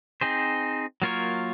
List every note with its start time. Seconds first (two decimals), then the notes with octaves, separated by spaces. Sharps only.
0.21 C4 D#4 G#4 C5
1.02 F#3 A#3 F4 A#4 C#5